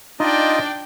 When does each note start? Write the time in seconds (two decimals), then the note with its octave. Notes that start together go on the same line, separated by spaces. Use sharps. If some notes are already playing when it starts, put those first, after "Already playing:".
0.20 D4 D#4 F4 D5 D#5 G5